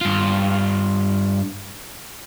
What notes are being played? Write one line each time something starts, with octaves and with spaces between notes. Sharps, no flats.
G2 F4